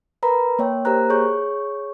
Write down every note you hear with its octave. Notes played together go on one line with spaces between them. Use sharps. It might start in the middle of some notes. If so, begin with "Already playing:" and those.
A#4 B4 A#5 B5
A#3 C#5 G5
A#3 G4 A#4 C5 A#5 F#6
G#4 C#5 C#6 G6